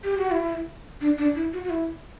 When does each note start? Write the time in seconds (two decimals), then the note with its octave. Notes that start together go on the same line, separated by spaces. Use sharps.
0.04 G4
0.18 F#4
0.31 E4
1.01 D4
1.18 D4
1.35 E4
1.53 F#4
1.63 F#4
1.70 E4